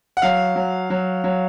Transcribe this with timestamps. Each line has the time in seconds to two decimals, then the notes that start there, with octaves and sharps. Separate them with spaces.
0.17 F#5
0.22 F#3 F5
0.56 F#3
0.90 F#3
1.24 F#3